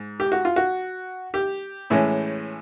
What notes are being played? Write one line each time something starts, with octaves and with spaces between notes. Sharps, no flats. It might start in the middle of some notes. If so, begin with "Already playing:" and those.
Already playing: G#2
G4
F#4
F4
F#4
G4
A2 E3 G#3 C#4